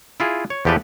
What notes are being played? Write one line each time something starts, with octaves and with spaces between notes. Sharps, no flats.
E4 F4 G#4
C#5
E2 F3 G4 A4 B4 G5